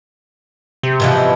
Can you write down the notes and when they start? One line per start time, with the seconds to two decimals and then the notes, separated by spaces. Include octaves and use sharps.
0.83 C3
1.00 B2 E3 F3